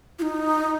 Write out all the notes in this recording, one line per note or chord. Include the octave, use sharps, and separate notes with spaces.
F4
D#4